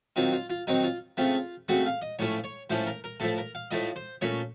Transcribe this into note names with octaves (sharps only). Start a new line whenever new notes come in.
D#3 F#3 C4 F4
F4
F4
D#3 F#3 C4 D#4
F4
C#3 A3 C4 F4
C#3 A3 C4 F#4
F5
D#5
A2 F3 A3 C#4 C#5
C#5
A2 F3 A3 C#4 C5
A#4
A#4
A2 F3 A3 A4
A#4
F5
A2 F3 A3 D#5
C5
A#2 A3 C#4 C#5